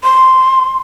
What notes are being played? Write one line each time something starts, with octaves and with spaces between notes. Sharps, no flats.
C6